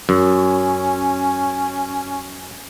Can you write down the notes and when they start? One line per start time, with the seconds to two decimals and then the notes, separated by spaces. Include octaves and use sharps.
0.09 F#2 C#4